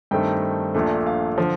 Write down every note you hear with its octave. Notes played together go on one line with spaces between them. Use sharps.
G2 D#3 A3 C4 G5
A#1 A#2 A3 D4
F5
D3 F3